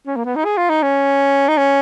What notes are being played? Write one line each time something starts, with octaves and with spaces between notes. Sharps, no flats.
C#4
A#3
B3
D#4
G#4
F4
D#4
C#4
D#4
C#4